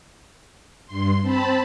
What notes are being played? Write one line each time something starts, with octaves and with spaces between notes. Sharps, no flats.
G2 C6
C4 A5 B5